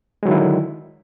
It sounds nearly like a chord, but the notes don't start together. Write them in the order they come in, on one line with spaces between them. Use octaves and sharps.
G#3 F#3 D#3 E4 D3